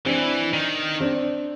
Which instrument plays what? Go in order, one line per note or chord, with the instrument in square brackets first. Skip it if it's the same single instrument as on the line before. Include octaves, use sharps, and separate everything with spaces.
[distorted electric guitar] E3 [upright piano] C4 D4
[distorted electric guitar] D#3
[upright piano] C4 D4